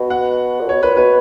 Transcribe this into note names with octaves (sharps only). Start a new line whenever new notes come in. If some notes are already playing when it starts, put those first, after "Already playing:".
Already playing: B2
F#5
A#2
B2 C#5
A#2 B4
B2 B4